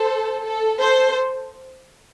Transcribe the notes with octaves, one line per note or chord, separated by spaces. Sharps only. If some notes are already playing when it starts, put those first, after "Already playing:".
Already playing: A4 C5
A4
A4 C5